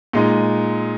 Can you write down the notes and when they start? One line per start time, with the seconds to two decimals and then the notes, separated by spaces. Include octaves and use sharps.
0.13 A#2 G#3 D#4